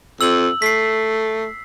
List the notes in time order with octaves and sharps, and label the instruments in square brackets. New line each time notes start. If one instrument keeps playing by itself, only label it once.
[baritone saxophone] F2 [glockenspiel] E6 F#7
[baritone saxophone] A3 [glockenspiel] B6 C7